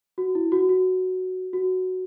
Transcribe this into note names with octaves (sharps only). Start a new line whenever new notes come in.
F#4
E4
F#4
F#4
F#4